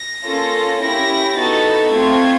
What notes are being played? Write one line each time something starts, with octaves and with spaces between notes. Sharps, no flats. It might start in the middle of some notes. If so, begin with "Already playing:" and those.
Already playing: A#6
A#3 C#4 F4 A4
C#4 E4 G4 A#6
B3 D#4 F#4 A4 A6
A3 C4 F4 G#6